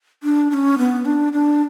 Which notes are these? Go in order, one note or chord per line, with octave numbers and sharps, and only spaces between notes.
D4
D4
C#4
B3
D4
D4